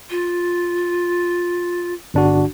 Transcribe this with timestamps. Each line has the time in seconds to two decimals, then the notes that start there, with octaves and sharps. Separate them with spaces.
0.10 F4
2.14 G1 D4 F#4